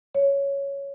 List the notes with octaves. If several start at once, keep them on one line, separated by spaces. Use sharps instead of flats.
C#5